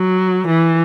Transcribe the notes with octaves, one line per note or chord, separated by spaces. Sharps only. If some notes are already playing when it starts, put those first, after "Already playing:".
Already playing: F#3
E3